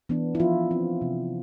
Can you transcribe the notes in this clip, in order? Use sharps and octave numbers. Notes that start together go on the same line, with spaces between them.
E3 B3 D4
E4
F3 F4
C4
C3